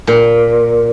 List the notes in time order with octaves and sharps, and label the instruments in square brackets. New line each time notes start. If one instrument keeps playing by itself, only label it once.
[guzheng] A#2